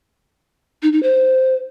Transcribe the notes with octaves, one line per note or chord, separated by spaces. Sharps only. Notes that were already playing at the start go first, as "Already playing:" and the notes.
D#4
D#4
C5